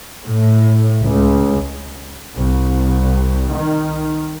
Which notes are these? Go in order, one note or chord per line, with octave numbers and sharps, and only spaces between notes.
A2
C#2
C2
D#3